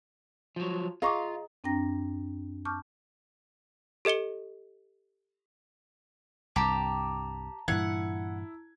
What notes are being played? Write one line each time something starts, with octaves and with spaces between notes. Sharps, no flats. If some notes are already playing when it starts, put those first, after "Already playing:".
F3 F#3
F4 G#4 D#5 F5 A#5 C#6 D6
F#2 C4 D4 G5 A#5 A#6
A5 C#6 D6 F6 G6
G4 A4 D#5 C#7 G7
C2 G2 G4 A5 A#5
G2 A#2 E3 E4 F#5 G#6